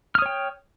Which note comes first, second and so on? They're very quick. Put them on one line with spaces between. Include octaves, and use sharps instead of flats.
F6 D#6 C#5 G5